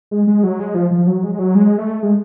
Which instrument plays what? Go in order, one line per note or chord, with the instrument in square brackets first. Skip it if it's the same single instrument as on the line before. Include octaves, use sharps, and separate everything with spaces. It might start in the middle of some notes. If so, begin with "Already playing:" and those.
[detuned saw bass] G#3
G#3
F#3
G#3
F3
F3
F#3
G#3
G#3
F#3
G#3
A3
G#3